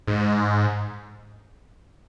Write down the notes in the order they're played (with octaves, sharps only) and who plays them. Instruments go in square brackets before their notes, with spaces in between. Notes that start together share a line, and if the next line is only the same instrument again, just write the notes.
[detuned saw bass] G#2